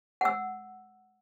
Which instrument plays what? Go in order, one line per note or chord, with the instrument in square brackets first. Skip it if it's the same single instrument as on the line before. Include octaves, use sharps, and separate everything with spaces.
[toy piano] F#5 E6